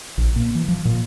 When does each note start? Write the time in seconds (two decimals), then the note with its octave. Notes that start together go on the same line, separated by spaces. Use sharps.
0.18 A#1
0.36 A#2
0.55 E3
0.68 F3
0.85 A#2